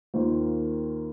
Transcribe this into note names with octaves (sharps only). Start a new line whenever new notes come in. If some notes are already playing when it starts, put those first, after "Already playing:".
D#2 D#3 A#3 F4 C5